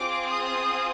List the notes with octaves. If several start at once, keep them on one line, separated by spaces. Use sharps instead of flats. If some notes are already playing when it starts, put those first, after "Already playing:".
Already playing: C4 F4 G#4 D6
D#6